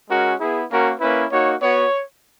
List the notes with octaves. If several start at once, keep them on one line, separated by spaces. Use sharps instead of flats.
G#3 C#4 F#4 A#4
B3 E4 G#4
A#3 C#4 F#4 A#4
A#3 C#4 E4 B4
A#3 D#4 F#4 C#5
B3 F#4 C#5